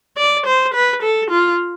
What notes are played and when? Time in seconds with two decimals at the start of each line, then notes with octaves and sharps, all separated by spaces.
0.17 D5
0.46 C5
0.74 B4
1.03 A4
1.31 F4